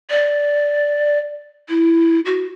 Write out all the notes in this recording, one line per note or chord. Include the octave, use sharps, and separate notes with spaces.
D5
E4
F#4